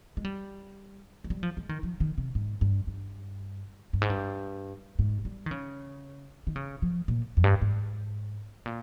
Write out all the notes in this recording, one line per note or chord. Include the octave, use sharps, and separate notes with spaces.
G#3
G3
G#3
G3
F3
G#3
D#3
F3
D#3
C3
G#2
G2
G2
G2
G#2
G2
G#2
G3
D#3
C#3
D#3
C#3
F3
A#2
F2
G2
G#2
A#2